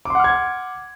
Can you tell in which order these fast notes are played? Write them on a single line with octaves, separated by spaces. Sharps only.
D6 C6 F#5 F6 G#6